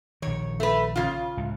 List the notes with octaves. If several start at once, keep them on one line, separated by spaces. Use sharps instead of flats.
A#1 D#3 C#5
A3 B4
C#3 F4
C#2 A2